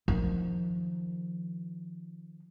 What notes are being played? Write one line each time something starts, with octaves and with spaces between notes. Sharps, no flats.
D#3 F3